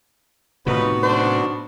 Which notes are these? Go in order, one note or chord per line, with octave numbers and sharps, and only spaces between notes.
A2 C3 D#3 F3 B3 D#4 F#4 B4
B1 D4 C5